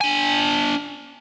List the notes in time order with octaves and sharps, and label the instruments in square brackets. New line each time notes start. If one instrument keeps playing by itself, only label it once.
[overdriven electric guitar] D4 G#5